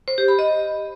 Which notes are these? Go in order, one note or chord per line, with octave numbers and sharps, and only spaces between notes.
C5
G4
B5
D#5